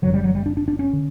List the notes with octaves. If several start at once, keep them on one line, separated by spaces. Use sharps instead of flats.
F#1 F#2 D3 F#3
G3
F#3
G3
D4
D4
D4
C#4
D3